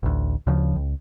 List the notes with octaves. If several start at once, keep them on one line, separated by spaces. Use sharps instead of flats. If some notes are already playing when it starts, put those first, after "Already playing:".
A1 D2
D2 C#3 F3
C#2